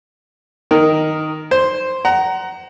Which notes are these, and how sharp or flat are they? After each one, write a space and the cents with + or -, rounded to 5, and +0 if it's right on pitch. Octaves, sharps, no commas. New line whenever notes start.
D#3 +0 A#4 -5
C5 +0 C6 +0
F#5 +25 A#5 +0